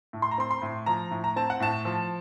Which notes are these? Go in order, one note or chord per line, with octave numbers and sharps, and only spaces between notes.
A2
C6
A#5
C4 C6
C6
A2
F3 A#5
A2
A#5
C4 A5
F#5
A2 A5
F3